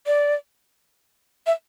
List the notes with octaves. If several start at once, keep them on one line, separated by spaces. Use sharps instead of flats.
D5
E5